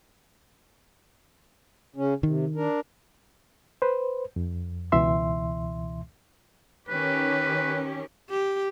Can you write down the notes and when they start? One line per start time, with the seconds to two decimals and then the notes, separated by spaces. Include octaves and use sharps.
1.96 C#3 C#4
2.23 C3 D#3
2.55 D4 A#4
3.82 B4 C5
4.36 F2
4.92 C#2 B2 E3 E5 C6
6.89 D#3 C#4 G4 B4
8.30 G4